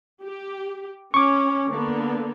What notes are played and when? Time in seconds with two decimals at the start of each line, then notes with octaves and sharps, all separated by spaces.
0.23 G4
1.14 C#4 C#6 D6
1.68 D3 A#3 B3